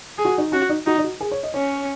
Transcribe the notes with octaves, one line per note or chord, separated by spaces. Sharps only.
G#4
F#4
D#4
C#4 F#4
D#4
D#4 F#4
D#4
F#4
G#4
C#5
D#5
C#4 C#5